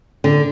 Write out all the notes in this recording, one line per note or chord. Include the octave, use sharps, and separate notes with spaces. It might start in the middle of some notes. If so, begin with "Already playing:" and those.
D3